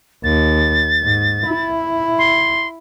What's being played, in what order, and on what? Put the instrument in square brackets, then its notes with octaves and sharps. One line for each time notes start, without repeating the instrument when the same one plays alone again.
[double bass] D#2 [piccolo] A6
[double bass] G#2
E4
[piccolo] C6